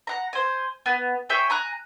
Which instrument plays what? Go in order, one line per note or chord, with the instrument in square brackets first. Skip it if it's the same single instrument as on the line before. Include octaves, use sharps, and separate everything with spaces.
[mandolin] F#5 A#5
C5 G#5
B3
G#4 C#5 E5 G5
G#5 A#5 F#6